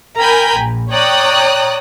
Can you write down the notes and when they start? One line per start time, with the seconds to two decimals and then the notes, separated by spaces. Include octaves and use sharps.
0.19 A#4 G5 G#5 A#5 B5 G6
0.57 A#1
0.92 C#5 D5 G5 A#5 D#6 F#6